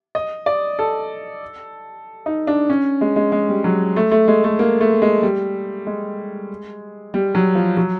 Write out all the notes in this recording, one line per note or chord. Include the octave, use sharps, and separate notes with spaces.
D#5
D5
A4
D#4
D4
C#4
G#3
G#3
G#3
G3
F#3
A3
A3
G#3
A3
A#3
A3
G#3
G3
G#3
G3
F#3
F3
F#3